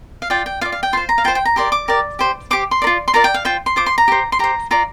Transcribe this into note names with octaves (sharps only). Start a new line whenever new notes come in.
F5
F4 D5 G5
G5
F4 D5 F5
F5
G5
F4 C5 C6
A#5
F5
F4 C5 G5
G5
A#5
G4 A#4 D5 C6
D6
G4 A#4 D5
G4 C5
G4 C5 D6
C6
A#4 D5
F4
C6
F4 A#4 D5 A#5
G5
F5
F4 C5 G5
C6
F4 C5 D6
C6
A#5
G4 C5
C6
G4 C5 A#5
F4 D5 A#5